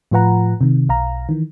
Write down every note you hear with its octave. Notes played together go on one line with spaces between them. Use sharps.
A2 F3 F4 B4 F#5 A#5
C3 D#3
B1 F5 A#5
D#3 E3